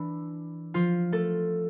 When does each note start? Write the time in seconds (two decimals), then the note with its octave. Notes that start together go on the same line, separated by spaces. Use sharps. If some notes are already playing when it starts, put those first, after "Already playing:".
Already playing: E3 D4 E4
0.74 F3 F4
1.12 A3 A4